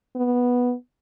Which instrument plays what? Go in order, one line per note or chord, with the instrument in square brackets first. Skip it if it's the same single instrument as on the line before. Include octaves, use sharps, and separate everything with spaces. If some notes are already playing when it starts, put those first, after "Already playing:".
[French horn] B3